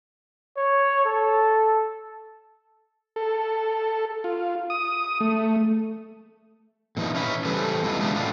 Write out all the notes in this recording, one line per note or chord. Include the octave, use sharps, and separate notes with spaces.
C#5
A4
A4
F4
D#6
A3
A#2 E3 F3 D#4
C#4 E4 B4
E3 G3 G4 A4 B4 C5
C3 E3 G#3 E4 F4
D3 A3 B3 D4
A2 D4 F4